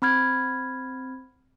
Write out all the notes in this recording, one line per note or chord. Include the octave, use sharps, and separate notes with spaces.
C4 B5 F6 G#6